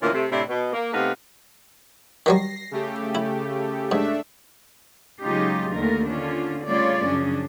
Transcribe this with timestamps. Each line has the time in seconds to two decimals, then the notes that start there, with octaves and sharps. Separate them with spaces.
0.01 D2 A#2 D#3 E3 C#4 F5
0.13 C3 A3
0.30 A2 C3 D4 E4
0.49 B2
0.73 A#3
0.93 C3 A3 B3 D#4 F5 F#5
2.26 D#3 F#3 G3 A#6 C7
2.71 C#3 A3 G4
3.15 E4
3.91 G#2 A3 D4 E5
5.22 C#3 F#3 G#3 D#4 F4 G4
5.74 D#2 D3 D#3 A3 A#4
6.07 D3 C#4 D4 F4
6.66 C#3 G3 A3 F4 C#5 D5
7.06 F#2 C#3 F3 C#4 D4